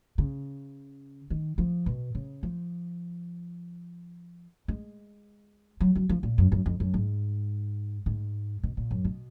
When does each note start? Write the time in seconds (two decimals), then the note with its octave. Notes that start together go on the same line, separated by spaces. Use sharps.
0.18 C#3
1.30 D#3
1.58 F3
1.86 B2
2.15 C#3
2.43 F3
4.68 G#3
5.81 F#3
5.95 F#3
6.09 F3
6.23 A#2
6.38 F#2
6.52 F#2
6.66 F2
6.80 F#2
6.94 G#2
8.06 G#2
8.63 B2
8.77 A#2
8.91 F#2
9.05 B2